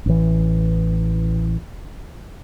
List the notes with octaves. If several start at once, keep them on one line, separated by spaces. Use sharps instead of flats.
A1 E3